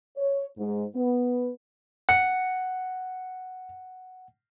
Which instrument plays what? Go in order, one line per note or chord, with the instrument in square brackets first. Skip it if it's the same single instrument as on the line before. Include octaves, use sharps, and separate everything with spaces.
[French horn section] C#5
G#2
B3
[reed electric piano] F#5 [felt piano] C#7